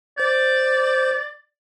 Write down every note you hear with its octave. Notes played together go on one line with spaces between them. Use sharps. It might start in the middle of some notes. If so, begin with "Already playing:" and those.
C5 D5 G6